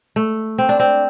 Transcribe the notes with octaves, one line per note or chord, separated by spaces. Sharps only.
A3
C4
D4
C4